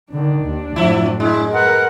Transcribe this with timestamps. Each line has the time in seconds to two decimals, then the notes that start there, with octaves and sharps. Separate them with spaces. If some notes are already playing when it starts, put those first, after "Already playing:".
0.11 D3 D#3 D4
0.45 D#2
0.76 F#2 A2 F3 E4
1.20 G#3 E4
1.54 A#4 B4 F#5